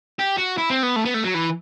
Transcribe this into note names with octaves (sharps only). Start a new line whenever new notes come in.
G4
F#4
E4
C4
B3
A3
B3
A3
F#3
E3